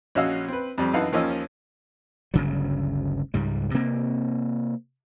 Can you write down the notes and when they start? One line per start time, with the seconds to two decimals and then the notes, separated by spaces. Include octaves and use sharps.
0.15 A#1 C#4 F#4 D#5 F5 E6
0.48 C4 B4
0.78 F2 G3 C4
0.94 F#2 E3 D#4 F5 F#5 A5
1.12 D#2 F3 A#3 C#4 D#5 E6
2.34 G1 D2 C#3 F#3
3.34 C#2 G#2 G3
3.74 C3 A#3 C4